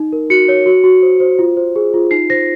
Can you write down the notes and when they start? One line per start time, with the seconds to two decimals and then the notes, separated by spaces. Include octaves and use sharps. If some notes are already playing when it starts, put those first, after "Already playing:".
Already playing: D#4
0.13 A#4
0.30 F#4 C#7
0.48 C#5
0.66 F#4
0.84 F#4
1.02 C5
1.20 C5
1.39 F4
1.57 C5
1.76 G#4
1.94 F4
2.11 D#4 C7
2.30 C5 A#6